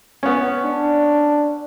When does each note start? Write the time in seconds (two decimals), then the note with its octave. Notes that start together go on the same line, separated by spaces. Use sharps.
0.23 B3 C#4
0.65 D4